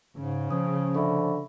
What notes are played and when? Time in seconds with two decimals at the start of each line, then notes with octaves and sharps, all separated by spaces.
0.17 G#2 C#3
0.51 F3 C#4 D#6
0.95 D3 E5 B5 C#6